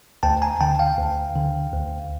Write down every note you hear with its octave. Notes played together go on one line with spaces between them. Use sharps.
D2 G5 A5
G#5 A#5
D3 G5 A5
F5 G5
D2
D3
D2